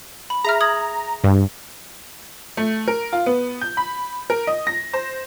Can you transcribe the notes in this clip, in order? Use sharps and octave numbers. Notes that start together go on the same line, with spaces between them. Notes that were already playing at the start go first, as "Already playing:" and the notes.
B5
G#4 E5 A#5 F6
D#6 G#6 F#7
G2
A3
A#4
F4
B3
G6
B5
A#4
D#5
A#6
C5